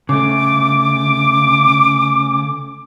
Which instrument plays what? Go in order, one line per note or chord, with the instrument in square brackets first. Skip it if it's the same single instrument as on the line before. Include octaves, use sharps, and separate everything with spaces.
[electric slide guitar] C#3 A3 [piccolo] D6